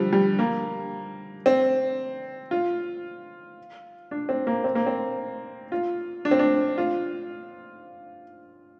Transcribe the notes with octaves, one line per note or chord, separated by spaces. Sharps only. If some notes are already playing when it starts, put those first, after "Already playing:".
Already playing: D3 F3 G3
G3
A#3
C4
F4
D4
C4
A#3
C4
A#3
C4
F4
D4
C4
D4
F4